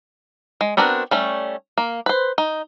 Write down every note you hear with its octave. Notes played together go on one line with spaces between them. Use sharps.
G#3
B3 C4 D4 F#4 A#4
G3 A3 C#4
A#3
B4 C5
D#4